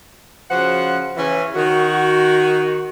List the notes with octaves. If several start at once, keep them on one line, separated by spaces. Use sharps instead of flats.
C#3 F3 F#4 C5 F#5
C#3 E3 C#4 E4
D#3 F#4